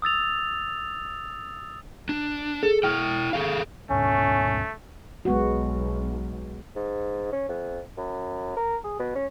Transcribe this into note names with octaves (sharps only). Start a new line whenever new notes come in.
D#6 E6 A6 F7
D4
G#4 A4
E4 G5 F6
G#4 A4 F5
D2 G#2 B2 A3 C#4
B1 G#3 B3 F#4
G#2
C#4
F2
F#2
A#4
G#4
B2
C#4